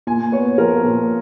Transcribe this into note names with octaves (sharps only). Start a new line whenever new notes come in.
A#2 G#5
B3 C#5
F3 A#4
A#2